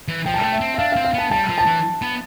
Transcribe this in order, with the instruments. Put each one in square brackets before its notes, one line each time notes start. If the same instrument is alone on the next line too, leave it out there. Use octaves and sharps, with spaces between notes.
[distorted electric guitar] E3
[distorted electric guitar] F3 [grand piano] G5
[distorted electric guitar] G3 [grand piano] A5
[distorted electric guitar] A3 [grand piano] G5
[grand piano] E5
[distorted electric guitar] C4
[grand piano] E5
[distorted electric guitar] D4 [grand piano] F5
[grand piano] F5
[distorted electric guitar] C4
[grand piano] F5
[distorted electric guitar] B3 [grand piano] A5
[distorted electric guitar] G3 [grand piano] A5
[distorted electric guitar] F3
[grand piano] A5
[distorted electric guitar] E3
B3